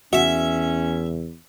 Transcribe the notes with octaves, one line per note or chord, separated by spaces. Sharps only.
E2 C#4 F#4 E5